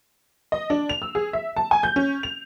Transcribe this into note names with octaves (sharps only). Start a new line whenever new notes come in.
D#5
D4
F7
E6
G#4
E5
A5
G#5
G6
C#4
F7